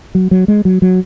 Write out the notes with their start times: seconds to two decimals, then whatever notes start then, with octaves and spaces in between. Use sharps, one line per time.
0.15 F#3
0.31 F#3
0.48 G#3
0.65 F#3
0.82 F#3